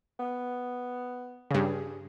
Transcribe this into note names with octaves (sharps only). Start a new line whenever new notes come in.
B3
G2 C#3 G#4